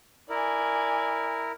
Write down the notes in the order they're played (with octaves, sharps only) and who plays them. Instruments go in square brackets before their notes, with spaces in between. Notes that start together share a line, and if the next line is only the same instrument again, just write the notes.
[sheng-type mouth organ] E4 A#4 [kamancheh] D5 G#5